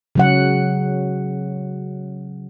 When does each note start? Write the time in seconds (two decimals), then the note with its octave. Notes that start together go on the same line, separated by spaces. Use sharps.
0.15 C#3 F#3 F#5